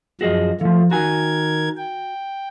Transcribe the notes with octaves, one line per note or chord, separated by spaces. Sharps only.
F#2 F3 F#4 G#4 D#5
E3 F3 A3 F4
D#3 F#4 A#4 G#5 G#6
G5